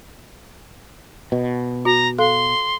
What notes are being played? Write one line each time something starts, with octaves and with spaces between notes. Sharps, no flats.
B2
F#4 A#5
A4 F5 C6